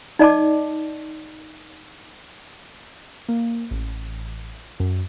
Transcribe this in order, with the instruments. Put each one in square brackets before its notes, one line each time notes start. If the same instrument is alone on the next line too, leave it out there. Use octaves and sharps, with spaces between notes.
[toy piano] D#4 D5 D#5 A5 D6
[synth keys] A#3
A1
F#2